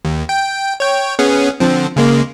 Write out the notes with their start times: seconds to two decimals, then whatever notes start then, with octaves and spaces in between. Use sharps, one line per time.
0.05 D#2
0.29 G5
0.80 C#5 G5
1.19 B3 C#4 G#4
1.60 D3 F3 C4
1.96 C#3 G#3 A#3